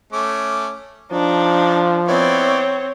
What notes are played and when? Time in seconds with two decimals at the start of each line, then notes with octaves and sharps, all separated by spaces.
0.13 A3 C#4 D6
1.12 F3 D4 D#4
2.08 B3 C4 E4 C#5 D5